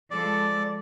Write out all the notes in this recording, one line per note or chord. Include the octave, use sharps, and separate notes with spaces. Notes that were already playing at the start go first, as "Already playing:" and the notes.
F3 G#3 A4 D5